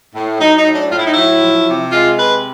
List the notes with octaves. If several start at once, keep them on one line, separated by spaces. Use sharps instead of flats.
A2
F#3 D#4
D#4
A2
D4
A2 F4
E4
D#4
F#3 E4
F3
C3
G#3 F4
C3 B4